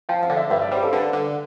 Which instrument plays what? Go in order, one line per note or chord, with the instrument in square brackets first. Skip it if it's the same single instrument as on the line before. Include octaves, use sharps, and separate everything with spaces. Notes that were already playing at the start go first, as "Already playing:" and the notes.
[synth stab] F3 [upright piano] G5
[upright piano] F5
[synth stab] D3
[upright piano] E5
[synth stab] G2 [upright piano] E5
[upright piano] D5
[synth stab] G3 [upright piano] C5
[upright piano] G4
A4
C5
[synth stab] D3 [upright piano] B4
[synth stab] D3